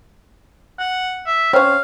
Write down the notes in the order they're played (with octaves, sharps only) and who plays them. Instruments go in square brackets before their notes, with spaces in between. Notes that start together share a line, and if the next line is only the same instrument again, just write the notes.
[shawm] F#5
E5
[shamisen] C4 C#4 [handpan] C#5 [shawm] F5